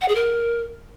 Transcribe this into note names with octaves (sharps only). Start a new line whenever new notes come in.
F#5
G#4
A#4